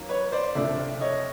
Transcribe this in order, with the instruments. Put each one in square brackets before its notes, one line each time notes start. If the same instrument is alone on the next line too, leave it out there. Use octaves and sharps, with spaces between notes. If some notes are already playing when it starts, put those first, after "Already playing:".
Already playing: [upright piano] D#3 F#3 A#3 C#4 F4
[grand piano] B4 C#5
C5 D5
[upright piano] C2 C3 F3 A3 D4 [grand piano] D5 E5
[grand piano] C#5 D#5